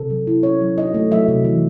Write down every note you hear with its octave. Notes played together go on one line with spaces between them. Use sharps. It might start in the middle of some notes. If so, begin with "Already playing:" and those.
Already playing: C3 A4
F#3
E4
C#4 C#5
F#3
D#4 D#5
A3
F#3 E5
C3
E3